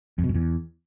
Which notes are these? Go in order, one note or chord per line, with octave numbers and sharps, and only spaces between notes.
F2
B2
F#2
E2